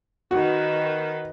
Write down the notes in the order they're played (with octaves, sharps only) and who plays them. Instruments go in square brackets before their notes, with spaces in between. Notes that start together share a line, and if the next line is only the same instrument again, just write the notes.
[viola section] D#3 B4 [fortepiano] F#4